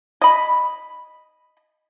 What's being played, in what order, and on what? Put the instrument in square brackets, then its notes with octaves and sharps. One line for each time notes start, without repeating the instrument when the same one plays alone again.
[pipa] D#5 B5